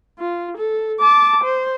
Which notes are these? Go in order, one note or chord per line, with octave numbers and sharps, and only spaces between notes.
F4
A4
A5 D6
C5